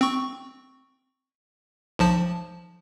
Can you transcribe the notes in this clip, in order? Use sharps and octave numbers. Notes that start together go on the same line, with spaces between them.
C4 C#6
B1 F3 A5